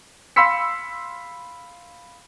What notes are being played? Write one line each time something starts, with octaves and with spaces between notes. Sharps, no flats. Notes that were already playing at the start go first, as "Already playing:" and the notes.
F5 B5 C6 E6 B6 C#7